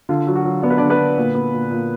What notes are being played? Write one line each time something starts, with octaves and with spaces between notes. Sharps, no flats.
D3 F4
F#3
F#4
F#3
B3 D5
B4
D3 D4 D5
B3 B4
D3
A#2
B3
A#2
A#2